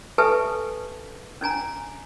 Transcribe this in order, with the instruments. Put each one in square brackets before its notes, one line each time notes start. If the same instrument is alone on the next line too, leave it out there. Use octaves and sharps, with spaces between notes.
[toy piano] G4 A4 B4 E5 G#5 A5
C#4 D4 G#5 A#5